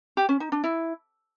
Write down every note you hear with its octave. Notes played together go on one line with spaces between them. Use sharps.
G4
C#4
D#4
D4
E4